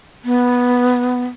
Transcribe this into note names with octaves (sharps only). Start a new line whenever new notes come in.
B3